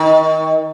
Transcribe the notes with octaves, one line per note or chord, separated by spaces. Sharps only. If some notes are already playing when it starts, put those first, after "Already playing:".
Already playing: D#3